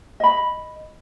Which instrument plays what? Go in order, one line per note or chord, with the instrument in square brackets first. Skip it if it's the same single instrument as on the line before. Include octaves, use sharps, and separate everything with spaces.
[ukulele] D#5 B5